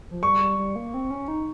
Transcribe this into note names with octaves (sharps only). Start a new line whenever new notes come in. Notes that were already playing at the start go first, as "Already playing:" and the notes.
F3
G3 C#6
G3
G3
A#3
C4
C#4
D#4